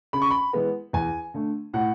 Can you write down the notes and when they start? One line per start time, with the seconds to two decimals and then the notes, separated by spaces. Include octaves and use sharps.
0.13 C#3 B5
0.22 C#6
0.31 B5
0.53 E3 G#3 B3
0.93 E2 G#5
1.34 D3 A3
1.73 A2 F#5